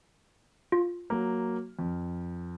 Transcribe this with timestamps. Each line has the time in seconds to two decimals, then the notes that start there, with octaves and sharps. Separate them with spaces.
0.72 F4
1.10 F#3 A#3
1.79 F2